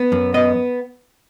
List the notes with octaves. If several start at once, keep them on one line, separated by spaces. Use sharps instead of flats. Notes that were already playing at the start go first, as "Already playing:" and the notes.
Already playing: B3
F#2
B3 D#5